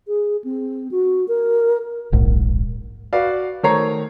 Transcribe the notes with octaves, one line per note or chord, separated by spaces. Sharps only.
G#4
C4
F#4
A#4
D1 A#1 G#2
F#4 B4 D5 F5
D#3 A3 C5 C#5 A#5 C7